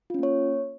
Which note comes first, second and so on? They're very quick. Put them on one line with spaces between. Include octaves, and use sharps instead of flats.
F4 C#4 A#3 C#5